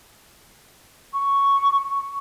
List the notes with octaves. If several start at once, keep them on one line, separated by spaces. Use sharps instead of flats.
C#6